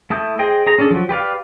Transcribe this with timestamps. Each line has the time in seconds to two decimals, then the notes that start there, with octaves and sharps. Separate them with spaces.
0.10 A3 E4 A5 D#6 G6
0.39 G#4 C5 D#5 G5
0.67 G#4 C5 A#5
0.78 C#4 D4 G#4 A4
0.91 F3 F#3
1.09 G4 B4 D5 F5